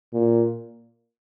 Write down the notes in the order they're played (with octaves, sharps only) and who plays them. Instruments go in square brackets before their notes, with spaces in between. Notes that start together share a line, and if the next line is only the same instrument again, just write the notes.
[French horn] A#2